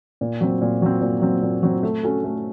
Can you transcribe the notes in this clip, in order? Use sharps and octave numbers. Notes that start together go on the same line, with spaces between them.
A#2
F#3 C4
A#2
F#3 C4
A#2
F#3 C4
A#2
F#3 C4
A3
C#4 F#4 A4
A3